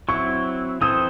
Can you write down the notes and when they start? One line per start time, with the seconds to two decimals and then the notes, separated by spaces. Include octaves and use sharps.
0.09 F#3 C4 E4 C#6
0.81 E3 C4 E4 A4 C5 D#6